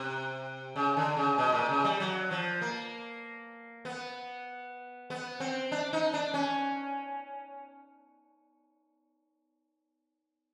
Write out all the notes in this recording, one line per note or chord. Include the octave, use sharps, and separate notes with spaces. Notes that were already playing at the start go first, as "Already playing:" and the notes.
Already playing: C3
C#3
D3
C#3
B2
A#2
C#3
G3
F#3
F3
A#3
B3
B3
C4
D4
D#4
D4
C#4